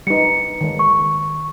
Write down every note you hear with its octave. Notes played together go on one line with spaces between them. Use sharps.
G3 D#4 B4 C#7
D#3 G#3
C#6